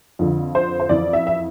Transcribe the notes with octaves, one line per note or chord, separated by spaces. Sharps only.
F2 D3 F3
C5
C5
F2 E3 D5
E5
E5